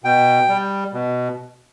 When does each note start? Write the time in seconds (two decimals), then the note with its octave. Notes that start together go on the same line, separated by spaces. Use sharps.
0.04 B2 G5
0.49 G3
0.93 B2